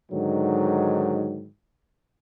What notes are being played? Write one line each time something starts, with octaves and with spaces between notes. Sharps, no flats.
G#2 D3 D#3 F#3